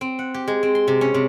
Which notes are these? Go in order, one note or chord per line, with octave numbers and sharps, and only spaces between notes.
C4
F#5
G4
G#3
C4
C6
C3
C#4
C3